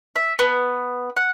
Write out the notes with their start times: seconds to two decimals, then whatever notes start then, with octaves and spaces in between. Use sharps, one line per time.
0.16 E5
0.39 B3
1.17 F#5